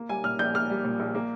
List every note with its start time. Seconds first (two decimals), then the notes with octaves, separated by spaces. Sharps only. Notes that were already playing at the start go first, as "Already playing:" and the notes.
Already playing: A#3
0.09 G3 G#5
0.24 A#2 F6
0.39 A#1 G6
0.54 A#3 F6
0.70 G3
0.85 A#2
1.00 A#1
1.15 A#3